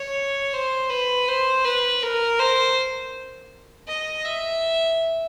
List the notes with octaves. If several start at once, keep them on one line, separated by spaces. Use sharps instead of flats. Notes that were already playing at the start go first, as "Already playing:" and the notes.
Already playing: C#5
C5
B4
C5
B4
A#4
C5
D#5
E5